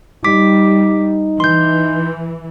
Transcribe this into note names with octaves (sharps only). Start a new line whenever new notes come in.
G3 D#4 D6 B6
E3 C6 G6